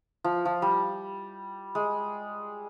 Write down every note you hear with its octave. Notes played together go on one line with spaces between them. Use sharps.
F3
F3
G3
G#3